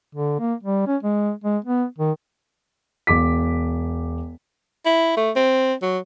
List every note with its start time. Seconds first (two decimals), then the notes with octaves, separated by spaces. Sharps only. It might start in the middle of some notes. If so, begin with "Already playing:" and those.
0.15 D3
0.39 A#3
0.63 G3
0.87 C#4
1.03 G#3
1.44 G#3
1.65 B3
1.98 D#3
3.07 E1 D6 B6
4.86 E4
5.17 A3
5.36 C4
5.82 F#3